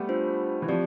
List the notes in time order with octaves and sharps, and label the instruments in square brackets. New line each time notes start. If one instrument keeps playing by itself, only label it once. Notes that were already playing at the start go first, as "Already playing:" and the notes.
Already playing: [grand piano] G3 A3 B3
[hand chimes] D4 F4 C5
[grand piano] E3
[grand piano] F3 [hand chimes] C4 G4 D5